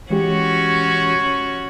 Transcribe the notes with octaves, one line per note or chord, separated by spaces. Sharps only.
E3 G#3 C#4 F#4 G4 C#5